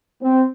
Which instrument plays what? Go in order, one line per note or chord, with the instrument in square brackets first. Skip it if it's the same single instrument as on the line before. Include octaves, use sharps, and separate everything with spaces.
[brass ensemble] C4